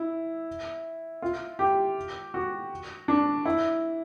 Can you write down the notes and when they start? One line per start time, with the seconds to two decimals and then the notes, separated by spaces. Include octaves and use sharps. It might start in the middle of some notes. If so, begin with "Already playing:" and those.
Already playing: E4
1.22 F4
1.59 G4
2.34 F#4
3.08 D4
3.46 E4